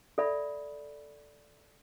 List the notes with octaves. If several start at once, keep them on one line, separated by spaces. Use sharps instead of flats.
A4 D5 E5 B5